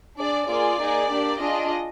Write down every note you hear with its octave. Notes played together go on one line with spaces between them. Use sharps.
D4 G#4 D5
A#3 F4 G#4 D5
A#3 D#4 G#4
A#3 D4 G4
D4 F4 G#4 D#5